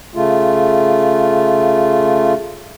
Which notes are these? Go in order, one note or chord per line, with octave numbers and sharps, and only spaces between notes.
C#3 A3 F4